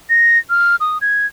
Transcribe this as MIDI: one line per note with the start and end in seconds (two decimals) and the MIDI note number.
0.10 0.38 94
0.50 0.76 89
0.80 0.98 87
1.01 1.26 92